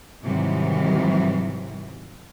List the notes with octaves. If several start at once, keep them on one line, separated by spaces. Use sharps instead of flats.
G#2 C3 D#3 E3 F#3 G3